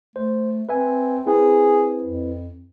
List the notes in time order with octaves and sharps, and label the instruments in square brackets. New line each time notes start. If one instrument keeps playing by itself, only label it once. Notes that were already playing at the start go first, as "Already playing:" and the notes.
[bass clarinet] A3 [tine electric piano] C5
[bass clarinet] C4 [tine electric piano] B4 E5 G#5
[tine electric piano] C4 E4 B4 [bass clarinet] G#4
[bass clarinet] F2